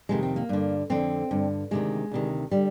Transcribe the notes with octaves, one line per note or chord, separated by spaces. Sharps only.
F2 C3 D#3 G#3
C4
A#3
G2 D3
F2 D3 C4
G2 D3
D2 C3 D#3 G#3
D2 C3 D#3
D3 G3